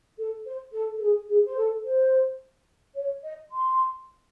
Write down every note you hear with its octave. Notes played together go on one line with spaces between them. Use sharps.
A4
C5
A4
A4
G#4
G#4
C5
A4
C5
C#5
D#5
C6